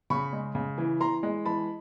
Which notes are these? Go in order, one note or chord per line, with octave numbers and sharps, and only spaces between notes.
C#3 B5 C#6
G#3
C#3
E3
E3 A#5 C6
G#3
E3 A5 B5